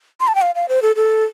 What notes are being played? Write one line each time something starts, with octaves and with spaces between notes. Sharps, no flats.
C6
A5
G5
F5
F5
C5
A4
A4